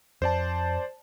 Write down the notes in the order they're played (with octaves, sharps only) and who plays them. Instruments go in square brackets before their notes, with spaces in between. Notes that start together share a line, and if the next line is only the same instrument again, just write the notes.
[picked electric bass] F2 [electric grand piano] C5 D5 A5